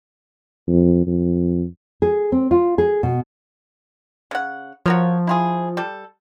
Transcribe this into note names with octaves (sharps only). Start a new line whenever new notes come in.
F2
F2
G#4
C4
F4
G#4
B2
C#3 F#5
F3 F#4 A#4 C#5
E4 F4 G#4
G3 A4